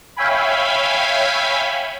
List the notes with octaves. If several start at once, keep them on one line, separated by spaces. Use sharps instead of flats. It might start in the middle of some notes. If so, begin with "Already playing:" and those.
C#5 E5 F5 G5 G#5 B5